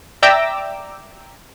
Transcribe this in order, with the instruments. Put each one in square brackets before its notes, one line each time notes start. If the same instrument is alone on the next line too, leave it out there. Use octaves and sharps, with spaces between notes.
[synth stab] D5 E5 G5 A#5 D6 E6